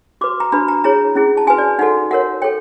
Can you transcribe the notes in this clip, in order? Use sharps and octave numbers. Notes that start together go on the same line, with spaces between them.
F#4 B4 D6
A#5
D4 F#4 B4 B5
A#5
E4 G#4 C#5 A#5
C#4 E4 G#4
A5
F#4 B4 G#5
D5
D#4 F#4 A4 F#5
F#4 A#4 C#5 F#5
A4 C#5 G5